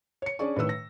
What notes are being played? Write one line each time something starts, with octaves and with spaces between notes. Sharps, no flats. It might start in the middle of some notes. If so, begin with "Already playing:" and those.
C#5 C#7
C#4 D4 G#4 D5 C#6
A2 D#3 B4 E6
A#6